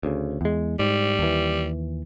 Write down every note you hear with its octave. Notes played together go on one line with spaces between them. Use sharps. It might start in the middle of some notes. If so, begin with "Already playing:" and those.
D2 C#3
E2 G#3
G#2 G3
D#2 E3